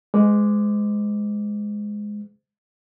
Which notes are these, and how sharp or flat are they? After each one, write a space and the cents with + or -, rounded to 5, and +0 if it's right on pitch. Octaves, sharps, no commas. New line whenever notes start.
G#3 +5 C5 -45 D6 +0